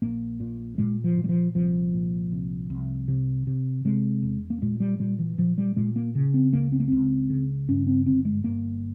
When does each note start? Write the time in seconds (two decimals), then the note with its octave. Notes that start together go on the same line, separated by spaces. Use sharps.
0.02 A#1 A#3
0.40 A#2
0.78 A#2 G#3
1.04 F3
1.17 A#2
1.24 G3
1.29 F3
1.54 C2 F3
1.94 A#2
2.32 C2
2.70 C2
3.08 C3
3.47 C3
3.85 C3 G#3
4.23 E1
4.50 A#3
4.62 A#2 G#3
4.80 G3
5.00 A#2 G3
5.19 E3
5.38 A#2 F3
5.58 G3
5.76 A#2 G#3
5.96 A#3
6.15 C#3
6.34 C4
6.53 C#2 A#3
6.72 C4
6.80 A#3
6.88 C#2 C4
7.30 C#3
7.68 G2 C#4
7.87 C4
8.06 G1 C4
8.25 G#3
8.44 G1 A#3